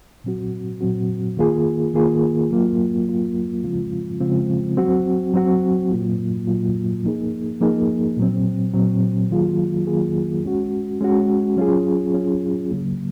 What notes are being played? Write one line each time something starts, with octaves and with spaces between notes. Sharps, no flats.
A#2 F#3 C4 F#4
A#2 F#3 C4 F#4
D#3 A#3 F4 G#4
D#3 A#3 F4 G#4
F#3 A#3 F4
F#3 A#3 F4
C#3 F3 G#3 C4 F4
C#3 F3 G#3 C4 F4
F#3 C4 F#4
F#3 C4 F#4
A#2 F#3 A#3 F4
A#2 F#3 A#3 F4
F3 A#3 D#4 G#4
F3 A#3 D#4 G#4
A#2 F#3 C4
A#2 F#3 C4
D#3 F#3 A#3 F4 G#4
D#3 F#3 A#3 F4 G#4
G#3 C#4 F#4
G#3 C#4 F#4
F#3 C#4 F4 G#4
F#3 C#4 F4 G#4
C#3 F#3 A#3